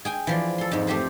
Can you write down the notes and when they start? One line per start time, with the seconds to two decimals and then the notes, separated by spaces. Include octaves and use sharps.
0.05 G#4 G5 G#5
0.27 E3 F3 D5
0.58 A4 C6
0.71 F2 G#2
0.87 A3 C4 G4 C5